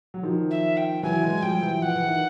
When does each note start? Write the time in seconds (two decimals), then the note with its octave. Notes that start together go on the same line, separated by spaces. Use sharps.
0.14 F#3
0.23 D#3 F3
0.50 E5
0.77 G5
1.03 E3 F#3 G#5
1.23 F#3 G#3
1.42 F3 G3 G5
1.62 E3 F#3
1.82 F3 F#5
1.96 E3
2.08 D#3